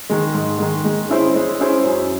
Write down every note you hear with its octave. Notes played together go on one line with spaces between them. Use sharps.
D#3 G#3
G#2
D#3 G#3
G#3
C#4 E4 G#4 C5
G#3
C#4 E4 G#4 C5
F#2